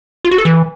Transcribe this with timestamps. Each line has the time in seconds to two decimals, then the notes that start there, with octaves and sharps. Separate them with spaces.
0.25 F4
0.31 F#4
0.38 A4
0.45 E3